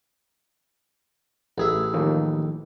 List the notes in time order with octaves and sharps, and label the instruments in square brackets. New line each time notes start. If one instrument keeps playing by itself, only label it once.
[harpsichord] A1 G#4 E5
[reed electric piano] D#3 F3 A#3